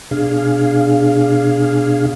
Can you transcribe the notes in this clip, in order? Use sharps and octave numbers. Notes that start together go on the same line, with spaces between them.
B2 D4 G#4 F5